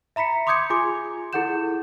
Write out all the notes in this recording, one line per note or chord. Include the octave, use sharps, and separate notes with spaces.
E5 A#5 B5 B6 C#7
C6 D6 D#6 G6 G#6 C#7
F4 G#4 G#5 C6 D6
E4 G#4 A4 F#5 G6 E7